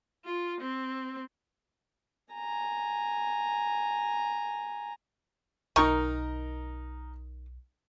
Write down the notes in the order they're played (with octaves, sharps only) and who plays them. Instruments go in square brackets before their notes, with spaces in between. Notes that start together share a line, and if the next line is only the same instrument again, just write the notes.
[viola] F4
C4
[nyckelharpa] G#5 A#5
[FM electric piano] B1 [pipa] D#3 C#6 [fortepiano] D#4 A#4